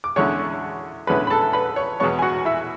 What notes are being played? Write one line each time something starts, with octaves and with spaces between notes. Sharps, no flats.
D6
E2 D3 G#3 C#4 E4 C#5 C#6
E2 D3 G#3 C#4 E4 B4 B5
B5
A4 A5
B4 B5
C#5 C#6
E2 B2 G#3 B3 C#5 C#6
G#5
F#4 F#5
E4 E5